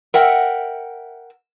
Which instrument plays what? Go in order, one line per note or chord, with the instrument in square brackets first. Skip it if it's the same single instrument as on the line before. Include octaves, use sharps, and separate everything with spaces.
[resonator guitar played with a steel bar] A#4 E5 F#5 G5